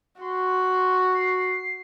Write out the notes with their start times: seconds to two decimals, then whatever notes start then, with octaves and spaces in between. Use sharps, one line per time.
0.20 F#4 C6
1.14 C7